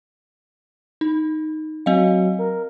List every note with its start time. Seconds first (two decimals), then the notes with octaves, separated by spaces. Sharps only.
1.01 D#4
1.86 F#3 C4 D#5 F5
2.39 A#4